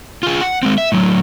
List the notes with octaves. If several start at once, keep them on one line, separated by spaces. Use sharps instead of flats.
F4 G#4
F#5
G#3 C4
E5
A2 F#3